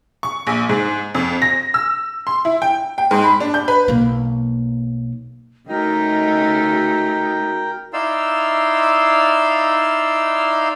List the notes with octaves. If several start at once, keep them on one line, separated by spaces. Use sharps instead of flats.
C#6
A#1
G#2
F2
A#6
E6
C6
E4
G5
G5
G#2
B5
D4
G6
B4
B1 A#3
C#3 A3 D#4 F#4 A#4 D#5 G5
D#4 E4 D5 F5 C6 E6